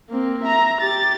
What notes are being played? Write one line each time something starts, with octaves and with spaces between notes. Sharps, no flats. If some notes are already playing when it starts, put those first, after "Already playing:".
A#3 C4
E5 A#5
G4 A6